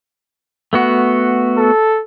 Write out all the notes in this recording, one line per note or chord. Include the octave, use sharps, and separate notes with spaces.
A3 B3 F#4
A4